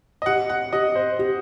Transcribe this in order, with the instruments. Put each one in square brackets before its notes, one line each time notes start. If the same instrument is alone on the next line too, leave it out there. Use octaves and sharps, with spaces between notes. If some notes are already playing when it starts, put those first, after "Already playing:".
[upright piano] D#5
[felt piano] G4 [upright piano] F#5
[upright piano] F#5
[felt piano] G4 [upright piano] D#5
[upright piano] C5
[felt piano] G4